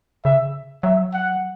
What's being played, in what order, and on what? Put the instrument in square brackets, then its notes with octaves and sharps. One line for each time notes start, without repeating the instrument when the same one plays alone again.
[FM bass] C#3 [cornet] E5
[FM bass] F#3 [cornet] E5
[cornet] F#5